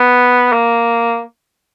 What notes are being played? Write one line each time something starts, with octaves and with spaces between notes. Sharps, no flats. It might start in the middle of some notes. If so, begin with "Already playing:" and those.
Already playing: B3
A#3